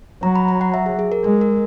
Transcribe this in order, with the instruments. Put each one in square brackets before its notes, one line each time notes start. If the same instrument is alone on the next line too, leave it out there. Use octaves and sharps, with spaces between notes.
[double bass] F#3 [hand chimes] A#5
[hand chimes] B5
A#5
F#5
E5
G#4
G#4
A#4
[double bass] G#3 [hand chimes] A#4
[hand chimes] A#4